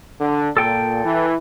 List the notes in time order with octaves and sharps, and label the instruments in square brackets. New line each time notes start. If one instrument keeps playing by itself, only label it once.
[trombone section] D3
[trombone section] A#2 [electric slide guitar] A4 G5
[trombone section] E3